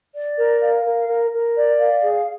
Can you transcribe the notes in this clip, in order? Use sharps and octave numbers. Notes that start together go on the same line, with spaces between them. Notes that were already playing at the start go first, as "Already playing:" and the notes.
D5
A#4
F5
A#4
A#4
A#4
D5
F5
G#4